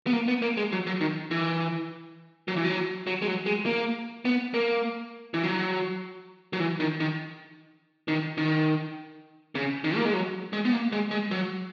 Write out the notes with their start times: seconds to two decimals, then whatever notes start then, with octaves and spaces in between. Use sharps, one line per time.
0.07 B3
0.13 A#3
0.28 B3
0.42 A#3
0.57 G#3
0.72 F#3
0.87 F#3
1.01 D#3
1.31 E3
2.48 F#3
2.57 E3
2.65 F#3
3.07 F#3
3.22 G#3
3.27 F#3
3.46 G#3
3.66 A#3
4.25 B3
4.54 A#3
5.34 E3
5.43 F#3
6.53 F#3
6.60 E3
6.80 D#3
7.00 D#3
8.08 D#3
8.38 D#3
9.55 C#3
9.84 D#3
9.96 A#3
10.05 G#3
10.13 F#3
10.53 G#3
10.65 B3
10.72 A#3
10.92 G#3
11.11 G#3
11.31 F#3